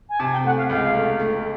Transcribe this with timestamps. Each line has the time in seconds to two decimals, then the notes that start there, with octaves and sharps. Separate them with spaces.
0.09 G#5
0.20 C3 A5
0.32 G5
0.44 A3 F#5
0.57 F5
0.70 C#2 F5
0.94 A3
1.20 A3